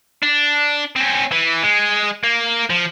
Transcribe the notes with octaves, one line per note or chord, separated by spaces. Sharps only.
D4
C4 C#4
E3
G#3
A#3
F3